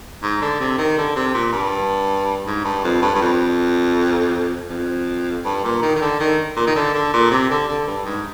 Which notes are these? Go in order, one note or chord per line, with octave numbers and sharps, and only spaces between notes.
G#2
D3
C3
D#3
D3
C3
A#2
G2
G#2
G2
F2
G2
G2
F2
F2
G2
A#2
D#3
D#3
D3
D#3
A#2
D#3
D3
D3
A#2
C3
D3
D3
G2
G#2